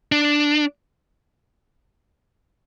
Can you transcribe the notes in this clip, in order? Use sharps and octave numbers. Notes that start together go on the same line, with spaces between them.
D4